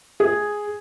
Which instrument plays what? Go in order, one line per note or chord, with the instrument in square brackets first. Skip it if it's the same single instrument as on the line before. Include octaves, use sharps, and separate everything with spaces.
[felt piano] G#4